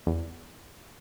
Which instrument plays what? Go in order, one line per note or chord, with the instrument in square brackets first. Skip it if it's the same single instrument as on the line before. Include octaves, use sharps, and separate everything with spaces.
[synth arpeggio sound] E2